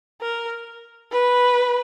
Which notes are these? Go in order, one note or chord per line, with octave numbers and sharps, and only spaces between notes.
A#4
B4